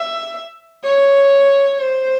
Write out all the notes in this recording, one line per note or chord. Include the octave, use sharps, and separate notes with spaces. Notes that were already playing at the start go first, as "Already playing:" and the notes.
Already playing: E5
C#5
C5